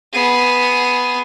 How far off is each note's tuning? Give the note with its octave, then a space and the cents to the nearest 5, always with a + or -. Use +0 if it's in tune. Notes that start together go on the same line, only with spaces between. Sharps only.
B3 +0 G#4 +0